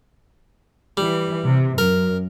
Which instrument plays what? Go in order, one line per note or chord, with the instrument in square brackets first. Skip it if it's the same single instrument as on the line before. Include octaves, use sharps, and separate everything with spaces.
[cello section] E3 [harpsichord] G3
[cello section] C3
[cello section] F#2 [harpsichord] A#4